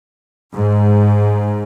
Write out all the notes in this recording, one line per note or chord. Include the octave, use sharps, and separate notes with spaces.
G#2